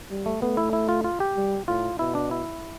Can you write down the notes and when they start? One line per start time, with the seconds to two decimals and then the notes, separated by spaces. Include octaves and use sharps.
0.10 G3
0.26 A3
0.42 A3 B3
0.57 E4
0.73 E4
0.89 F4
1.04 F4
1.20 G4
1.36 G3
1.68 A2 F4
1.99 B2 E4
2.15 D4
2.31 E4